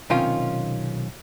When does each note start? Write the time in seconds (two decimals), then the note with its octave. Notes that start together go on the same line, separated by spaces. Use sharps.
0.10 B1 C3 D#3 C#4 F4